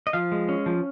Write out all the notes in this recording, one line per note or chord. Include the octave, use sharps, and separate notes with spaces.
D#5
F3 F5
G#3
C#4
F3